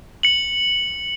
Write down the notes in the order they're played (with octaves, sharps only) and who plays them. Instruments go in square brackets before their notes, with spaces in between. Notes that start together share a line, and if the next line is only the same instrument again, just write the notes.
[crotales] C#7 F#7